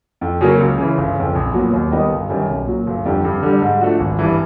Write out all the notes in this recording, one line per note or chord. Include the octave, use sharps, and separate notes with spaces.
F2
C#3 F#3 A#3 C#4
C#2
C#3 E3
G1
F2 C#3
A#1
A#2 F#3 B3
D#2
D#3 G3 B3 D#4
G1
F#2 D#3 G3
B1
A#2 F#3
G1
F2 D3 G3
G2
D3 G3
G#2
F3 A3 D4 F#4
G#1
G2 E3